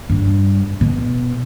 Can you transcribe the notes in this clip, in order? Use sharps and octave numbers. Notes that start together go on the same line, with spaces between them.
G2
B2